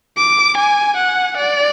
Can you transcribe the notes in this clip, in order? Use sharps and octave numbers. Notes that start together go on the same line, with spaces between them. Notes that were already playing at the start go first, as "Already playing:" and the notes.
D6
G#5
F#5
D5